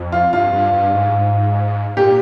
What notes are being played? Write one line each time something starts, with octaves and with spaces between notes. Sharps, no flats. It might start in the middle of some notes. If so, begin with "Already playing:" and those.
Already playing: F2
F4
G2 F4
G2
G2
G#2
A#2 G4